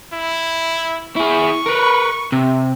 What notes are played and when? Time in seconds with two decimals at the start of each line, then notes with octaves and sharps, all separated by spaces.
0.13 E4
1.16 E4 G#4 C#6
1.66 A#4 B4
2.32 C3